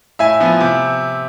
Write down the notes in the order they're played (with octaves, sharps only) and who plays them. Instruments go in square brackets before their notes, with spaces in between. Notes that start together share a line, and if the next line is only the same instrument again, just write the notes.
[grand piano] A2 E5 G#5
F3 B3
C3